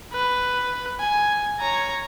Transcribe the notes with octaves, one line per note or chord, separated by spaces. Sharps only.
B4
G#5
C#5 A#5